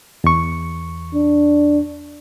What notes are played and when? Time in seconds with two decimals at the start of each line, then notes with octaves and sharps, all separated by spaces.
0.24 E2 C#6
1.14 D4